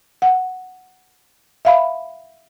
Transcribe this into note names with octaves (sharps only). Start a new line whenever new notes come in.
F#5
E5 F5 B5